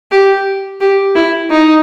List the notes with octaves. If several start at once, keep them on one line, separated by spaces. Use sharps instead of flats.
G4
G4
E4
D#4